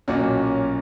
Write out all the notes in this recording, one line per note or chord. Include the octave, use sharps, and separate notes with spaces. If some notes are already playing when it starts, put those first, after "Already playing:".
B1 A#2 A#3 C#4 F#4